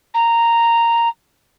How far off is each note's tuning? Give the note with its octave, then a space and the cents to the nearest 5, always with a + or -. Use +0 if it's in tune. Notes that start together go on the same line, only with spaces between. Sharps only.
A#5 -5